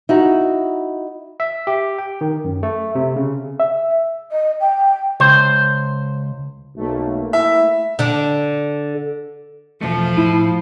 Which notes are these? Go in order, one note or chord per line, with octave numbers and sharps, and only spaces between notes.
D#4 E4 F#4
E5
G4
G5
D#3
F#2
A3
C3
C#3
E5
D#5
G5
C#2 C5
B1 A3 A#3
E4 E5
D3 D4
B1 E2 F3 A3
A2 E4